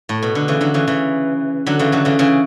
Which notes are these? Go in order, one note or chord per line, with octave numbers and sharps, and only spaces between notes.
A2
B2
D3
C#3 E3
D3 F#3
C#3 E3
C#3 E3
D3 F#3
C#3 E3
D3 F#3
C#3 E3
C#3 E3